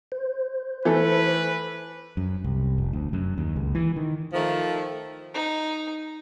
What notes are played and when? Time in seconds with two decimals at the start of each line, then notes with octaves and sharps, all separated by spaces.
0.12 C5
0.85 E3 A3 A4 B4
2.17 F#2
2.44 C2
2.78 F1
2.93 D2
3.13 F#2
3.38 D#2
3.56 C#2
3.75 E3
3.96 D#3
4.33 D#3 F3 A3
5.34 D#4